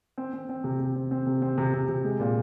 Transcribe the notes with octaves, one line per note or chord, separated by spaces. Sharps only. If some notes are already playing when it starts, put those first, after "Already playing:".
C4
C4
C4
C3
C3
C4
C4
C3
C4
C3
C3
C3
G#3
A#2